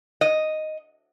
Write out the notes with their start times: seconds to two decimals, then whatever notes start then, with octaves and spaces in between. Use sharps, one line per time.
0.21 D#5